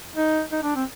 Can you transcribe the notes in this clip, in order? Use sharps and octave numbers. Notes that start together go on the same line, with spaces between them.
D#4
D#4
D4
C4